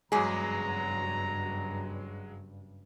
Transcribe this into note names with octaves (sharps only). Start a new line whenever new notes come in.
F#1 E2 G2 F#3 G#3 G#4 A#5